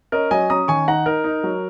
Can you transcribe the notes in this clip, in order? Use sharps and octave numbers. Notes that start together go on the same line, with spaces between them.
C#4 A#4 D#5
F#3 D#5 G#5
C#4 A#5 D#6
D#3 G#5 C#6
D#4 F#5 A#5
D#4 A#4
D#4
F#3